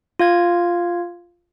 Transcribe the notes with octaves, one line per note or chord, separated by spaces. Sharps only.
F4 F5 G#6